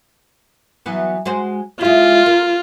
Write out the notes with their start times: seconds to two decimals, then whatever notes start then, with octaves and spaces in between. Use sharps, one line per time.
0.86 E3 F#3 B3
1.25 G#3 F#4 C5
1.81 G#3 E4 F4
2.26 A#4